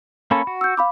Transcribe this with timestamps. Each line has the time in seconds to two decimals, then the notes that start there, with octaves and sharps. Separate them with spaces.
0.31 A#3 C#4 A4 B5
0.47 F#4
0.61 E6 G6
0.77 F5 B5 D6